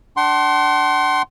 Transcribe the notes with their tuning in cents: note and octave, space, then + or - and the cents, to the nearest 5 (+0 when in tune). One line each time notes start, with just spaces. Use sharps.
D4 +0 F#5 +45 C6 +10